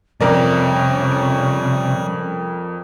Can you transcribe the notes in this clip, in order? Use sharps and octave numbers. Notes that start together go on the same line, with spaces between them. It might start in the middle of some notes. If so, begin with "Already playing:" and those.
F2 C3 G3 C#4 A#4 D5